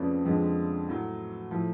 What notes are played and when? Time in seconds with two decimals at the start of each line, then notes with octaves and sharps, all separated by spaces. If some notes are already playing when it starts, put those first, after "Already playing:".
Already playing: F2 C#3 F3 A3 B4 C#5 D5
0.25 F2 D3 F3 G#3
0.88 A2 F#3 A3
1.51 A2 F3 A3